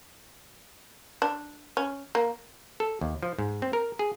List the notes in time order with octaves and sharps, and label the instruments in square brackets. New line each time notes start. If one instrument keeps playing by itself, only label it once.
[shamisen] D4
C#4
A#3
[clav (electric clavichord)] A4
D#2
F3
G#2
C4
A#4
G#4